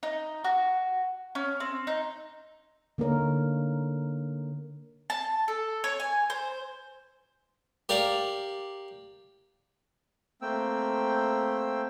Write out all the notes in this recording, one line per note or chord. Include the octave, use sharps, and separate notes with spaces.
D#4
F#4
C#4
C4
D#4
D3 A#3 D#4 A#4 C#5
A5
A4
C#5
G#5
C5
G4 A#4 D5 F5
A3 A#3 C4 G5 E6